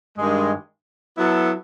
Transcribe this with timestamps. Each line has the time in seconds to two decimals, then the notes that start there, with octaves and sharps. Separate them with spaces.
0.17 G2 D#3 G#3
1.17 F#3 B3 E4 A4